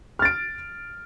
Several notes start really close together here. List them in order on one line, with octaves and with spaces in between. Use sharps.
F6 A6 D7